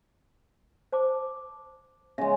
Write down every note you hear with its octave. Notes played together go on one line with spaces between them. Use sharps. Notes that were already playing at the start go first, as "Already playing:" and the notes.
C5 A5 D6
C#3 G#3 E5